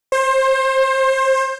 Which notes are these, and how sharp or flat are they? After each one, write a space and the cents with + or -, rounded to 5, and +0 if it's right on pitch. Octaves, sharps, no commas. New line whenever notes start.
C5 +25